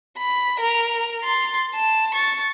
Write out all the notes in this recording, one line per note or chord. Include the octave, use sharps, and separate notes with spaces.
B5
A#4 F7
C6 A6
A5
C#6 A6